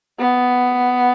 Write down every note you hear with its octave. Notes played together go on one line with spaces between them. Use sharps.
B3